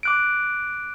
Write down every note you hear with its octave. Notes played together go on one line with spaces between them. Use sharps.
D6 F#6 D7